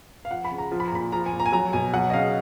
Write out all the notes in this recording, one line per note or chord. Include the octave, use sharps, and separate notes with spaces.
F5
F3 F#5
B5
C#3
A#5
F3
B5
A#5
A#2 B5
F3 A#5
G#5
A#2
A#5
G#5
F#3 A#5
B2 G#5
F#3 F#5
D#5
C#3 F5